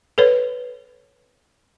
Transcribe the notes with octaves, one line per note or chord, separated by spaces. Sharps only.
A4 B4 C#5